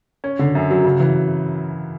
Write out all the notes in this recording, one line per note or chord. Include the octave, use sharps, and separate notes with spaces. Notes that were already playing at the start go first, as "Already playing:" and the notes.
C#4
D3
F#2
F#3
C#3
E3